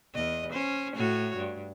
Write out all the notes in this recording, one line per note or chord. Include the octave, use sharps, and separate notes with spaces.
E2 D#5
C#4 C5
A2 F#4 C#5
G2